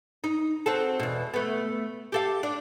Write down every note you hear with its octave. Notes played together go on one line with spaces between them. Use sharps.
D#4
C4 F#4 A4
E2 B2
A3 B3
G4 A4 F5
D4